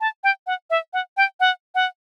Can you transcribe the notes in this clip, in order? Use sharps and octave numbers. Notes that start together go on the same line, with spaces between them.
A5
G5
F#5
E5
F#5
G5
F#5
F#5